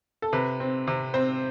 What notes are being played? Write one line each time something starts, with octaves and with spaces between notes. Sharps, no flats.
A4
C3 B4
C4
C3
C4 C5